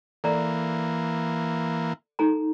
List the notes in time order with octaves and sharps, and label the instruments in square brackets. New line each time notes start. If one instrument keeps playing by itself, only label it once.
[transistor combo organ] E3 A#3 [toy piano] A4 D5 A#5
[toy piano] D#4 A4 A#5